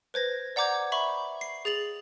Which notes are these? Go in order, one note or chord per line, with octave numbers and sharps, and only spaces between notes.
B4 C5 G#6 A#6
D5 F#5 A#5 D6 G6 G#6
E5 B5 C#6
C7
G#4 A6 F7 F#7